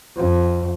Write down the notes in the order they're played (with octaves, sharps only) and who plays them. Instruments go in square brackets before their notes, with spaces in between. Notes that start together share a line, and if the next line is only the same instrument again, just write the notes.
[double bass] F2